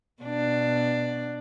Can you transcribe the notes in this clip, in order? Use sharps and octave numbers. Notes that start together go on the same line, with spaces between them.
B2 D4